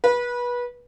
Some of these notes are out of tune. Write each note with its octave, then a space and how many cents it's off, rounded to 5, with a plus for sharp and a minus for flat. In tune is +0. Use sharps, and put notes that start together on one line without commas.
B4 -25